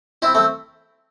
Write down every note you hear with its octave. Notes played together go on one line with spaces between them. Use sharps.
C4 E4
A3 C4